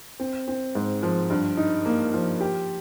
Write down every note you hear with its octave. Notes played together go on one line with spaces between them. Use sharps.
C4
C4
G#2
F3
G2
D#4
A#3
F3
G4